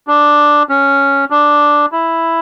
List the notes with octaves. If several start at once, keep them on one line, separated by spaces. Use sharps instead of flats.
D4
C#4
D4
E4